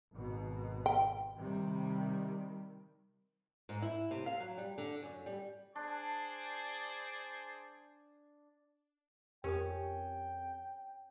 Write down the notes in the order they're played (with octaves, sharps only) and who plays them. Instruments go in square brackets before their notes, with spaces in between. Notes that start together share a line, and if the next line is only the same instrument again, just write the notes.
[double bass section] G#1 B2
[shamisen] G5
[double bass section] C3 D#3 G3
[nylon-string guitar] G#2
E4
C3
F5
F#3
G3
D3
F#2
G3
[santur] D4 [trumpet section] G#4 C5 D5
[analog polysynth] F2 [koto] C#4 [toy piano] G4 A#4 D#6 [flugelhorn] G5